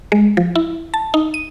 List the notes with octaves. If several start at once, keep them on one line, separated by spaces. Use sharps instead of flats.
G#3
F3
E4
A5
D#4
D#7